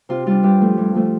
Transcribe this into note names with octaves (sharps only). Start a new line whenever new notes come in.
C3 F4
G3 D4 F4
G2 G4
F3 A3
G2
F3 A3